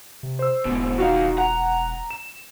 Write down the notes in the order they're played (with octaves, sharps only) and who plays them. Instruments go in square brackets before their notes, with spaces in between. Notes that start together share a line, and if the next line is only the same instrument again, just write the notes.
[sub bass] C3
[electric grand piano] C5 E6
[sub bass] E1 [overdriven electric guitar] G#2 B2
[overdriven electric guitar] D#2 F5 [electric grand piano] D#4 F4 F#4
[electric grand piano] F#5 [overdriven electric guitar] A#5
[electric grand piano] E7